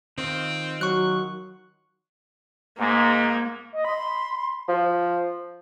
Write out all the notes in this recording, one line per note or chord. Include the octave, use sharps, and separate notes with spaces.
D#3 C4 F4
F#3 C#6 F#6
G#2 A#3
D#5
B5 C6
F3